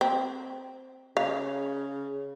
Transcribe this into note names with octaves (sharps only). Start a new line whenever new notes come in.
C4
C#3 F5